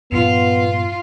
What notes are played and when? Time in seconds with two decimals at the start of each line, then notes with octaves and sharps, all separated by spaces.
0.12 G2 A#2 F3 B3 F4